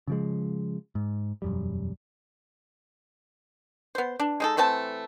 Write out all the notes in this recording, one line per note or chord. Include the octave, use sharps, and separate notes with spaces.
C#3 F3 G#3
G#2
E1 F#2 G3
B3 C5
D4
G#3 D#4 A4
E3 A3 C4 A5